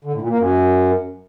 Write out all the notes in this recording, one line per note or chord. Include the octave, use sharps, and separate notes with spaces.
D3
A2
A#2
A#3
F#2